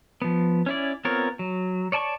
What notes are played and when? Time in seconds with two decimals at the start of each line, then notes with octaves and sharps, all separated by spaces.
0.22 F3 B3
0.66 C#4 E4 D5
1.05 B3 C4 F4 A#4 C#5
1.39 F#3
1.92 C#5 D5 A5 A#5 C#6